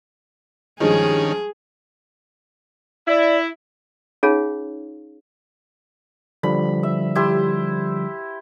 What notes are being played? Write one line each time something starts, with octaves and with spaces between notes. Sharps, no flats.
G2 D#3 F3 G#3 C#4 G#4
E4 D5
C#4 D#4 F4 G#4 C#5 F5
D3 F3 G3 B5
E5
E4 G4 C5